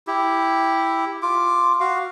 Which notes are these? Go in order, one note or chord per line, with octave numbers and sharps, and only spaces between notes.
E4 G4
F4 D6
F#4 F5